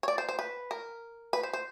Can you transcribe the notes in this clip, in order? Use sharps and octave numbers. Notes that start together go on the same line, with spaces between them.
C#5
D5
C5
C5
B4
A#4
B4
C5
C5